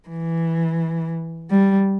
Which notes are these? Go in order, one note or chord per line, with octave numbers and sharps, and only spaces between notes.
E3
G3